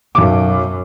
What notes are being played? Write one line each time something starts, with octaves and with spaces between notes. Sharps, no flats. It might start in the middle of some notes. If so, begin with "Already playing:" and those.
B1 F#2 D6